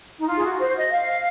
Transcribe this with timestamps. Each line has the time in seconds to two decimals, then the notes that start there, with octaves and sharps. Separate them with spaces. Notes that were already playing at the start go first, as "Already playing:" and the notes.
0.20 D#4
0.28 F4
0.37 G#4
0.43 F#4
0.59 C5
0.75 D#5
0.92 F5